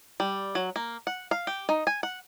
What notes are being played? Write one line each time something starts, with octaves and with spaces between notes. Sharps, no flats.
G3
F#3
A#3
F#5
F5
G4
D#4
G#5
F#5